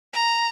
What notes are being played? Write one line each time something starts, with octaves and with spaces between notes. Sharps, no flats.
A#5